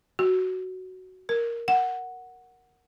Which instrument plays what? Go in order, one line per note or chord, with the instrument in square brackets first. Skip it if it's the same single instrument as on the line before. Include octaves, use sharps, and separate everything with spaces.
[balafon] F#4
A#4
F#5